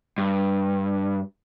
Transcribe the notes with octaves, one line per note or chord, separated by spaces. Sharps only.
G2